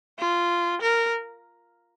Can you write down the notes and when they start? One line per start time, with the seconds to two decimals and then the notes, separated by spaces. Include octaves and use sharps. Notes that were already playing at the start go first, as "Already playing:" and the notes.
0.19 F4
0.81 A#4